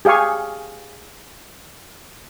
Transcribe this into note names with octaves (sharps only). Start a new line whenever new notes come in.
G4 G#4 F5 G#5 C#6